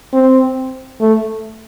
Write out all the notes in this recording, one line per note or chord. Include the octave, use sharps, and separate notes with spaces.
C4
A3